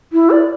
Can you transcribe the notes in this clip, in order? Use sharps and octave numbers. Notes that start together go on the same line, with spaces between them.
E4
D5